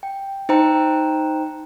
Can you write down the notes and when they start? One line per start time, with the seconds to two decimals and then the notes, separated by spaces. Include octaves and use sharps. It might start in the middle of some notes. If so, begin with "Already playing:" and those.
0.03 G5
0.49 D#4 C5 G5 A#5